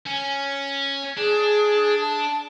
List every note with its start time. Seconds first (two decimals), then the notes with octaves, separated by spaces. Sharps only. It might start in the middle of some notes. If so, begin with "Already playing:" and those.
0.06 C#4
1.17 D4 G#4
2.01 A5